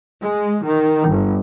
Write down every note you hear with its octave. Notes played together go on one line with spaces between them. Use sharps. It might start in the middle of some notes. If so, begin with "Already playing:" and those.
G#3
D#3
G1